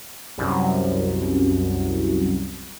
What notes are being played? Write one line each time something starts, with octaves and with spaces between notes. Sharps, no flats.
C2 F#2